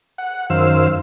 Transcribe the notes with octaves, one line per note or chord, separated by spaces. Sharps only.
F#5
F#2 D#3 C5 F5 E6